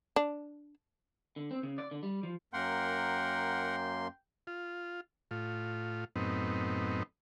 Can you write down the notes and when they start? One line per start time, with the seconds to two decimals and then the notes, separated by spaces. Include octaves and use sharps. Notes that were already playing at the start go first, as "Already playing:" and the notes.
0.16 D4
1.36 D3
1.51 C4
1.63 C#3
1.78 D5
1.91 D3
2.03 G3
2.23 F3
2.53 F#2 A#3 A#4 F#5 G5 C6
4.47 F4
5.31 A2 F4
6.16 F#2 A2 B3 C4 D#4